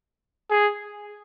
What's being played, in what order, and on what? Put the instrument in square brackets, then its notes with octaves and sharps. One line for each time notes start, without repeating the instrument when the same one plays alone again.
[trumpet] G#4